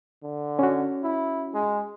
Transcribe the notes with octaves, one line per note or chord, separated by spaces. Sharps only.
D3
C#4 F#4
E4
G#3